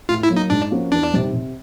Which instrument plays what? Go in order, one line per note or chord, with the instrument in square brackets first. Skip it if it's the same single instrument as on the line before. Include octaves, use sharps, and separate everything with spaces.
[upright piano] A2 [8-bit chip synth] F4
[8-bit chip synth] E4
[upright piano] F#3 A#3
[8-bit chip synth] D#4
[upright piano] G#2 [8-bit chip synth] D4
[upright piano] F3 A#3 C#4 F#4
[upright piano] E2 [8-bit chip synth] D4
[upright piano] C3 D#3 G3 C4
C3